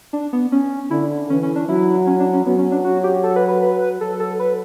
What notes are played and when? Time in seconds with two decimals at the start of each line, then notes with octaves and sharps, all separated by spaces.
0.13 D4
0.33 B3
0.52 C#4
0.91 D3 E4
1.30 E3 C#4
1.43 C#4
1.56 D4
1.69 F#3 E4
2.07 C#4
2.20 D4
2.33 C#4
2.46 F#3 B3
2.58 C#4
2.72 D4
2.84 F#4
3.04 G4
3.23 A4
3.36 B4
3.48 B4
3.62 B4
4.00 F#3 A4
4.20 A4
4.39 B4